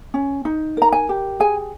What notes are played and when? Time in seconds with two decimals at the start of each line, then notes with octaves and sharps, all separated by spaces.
0.14 C#4
0.45 D#4
0.77 A#4 A#5
0.92 G#5
1.09 G4
1.40 G#4 G#5